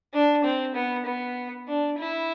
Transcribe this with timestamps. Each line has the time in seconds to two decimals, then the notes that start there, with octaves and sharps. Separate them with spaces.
0.13 D4
0.44 C4
0.75 B3
1.06 B3
1.68 D4
1.99 E4